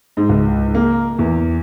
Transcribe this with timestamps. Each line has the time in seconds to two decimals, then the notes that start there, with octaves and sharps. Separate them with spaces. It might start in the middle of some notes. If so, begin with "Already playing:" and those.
0.17 G#2
0.29 C#2
0.75 A#3
1.19 E2